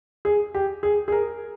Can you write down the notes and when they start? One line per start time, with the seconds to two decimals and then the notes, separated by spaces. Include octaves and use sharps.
0.25 G#4
0.55 G4
0.83 G#4
1.08 G#4
1.12 A#4